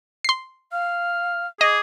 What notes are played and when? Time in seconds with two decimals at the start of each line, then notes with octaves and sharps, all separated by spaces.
0.25 C6 C7
0.72 F5 F6
1.61 G#4 D#5 D6